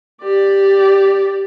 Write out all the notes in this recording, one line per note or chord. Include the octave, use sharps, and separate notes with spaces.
G4 D5